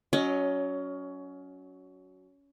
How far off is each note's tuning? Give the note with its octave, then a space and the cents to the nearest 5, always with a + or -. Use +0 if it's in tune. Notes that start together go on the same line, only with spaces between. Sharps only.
F#3 +0 C#4 +20 D#5 +0